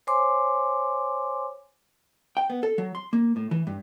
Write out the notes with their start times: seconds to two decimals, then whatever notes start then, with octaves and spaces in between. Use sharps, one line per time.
0.07 C5 C#5 G#5 C6 D6
2.37 G5
2.50 B3
2.63 A4
2.78 F#3
2.95 C6
3.13 A#3
3.36 A2
3.51 E3
3.67 G2